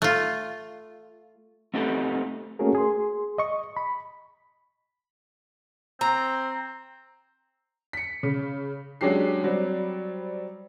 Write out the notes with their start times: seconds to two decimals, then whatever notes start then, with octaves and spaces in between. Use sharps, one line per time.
0.02 A3 F4
1.74 A3 B3 C4 D#4 G4 A4
2.59 A3 A#3 C#4 F#4 G#4 A#4
2.75 G#4 C6
3.38 D#5 C#6
3.77 B5
6.01 C4 A#5
7.93 B6 C#7
8.23 C#3
9.01 F#3 G#3 C#4 D4 G4 C7
9.44 F#3 G3 C4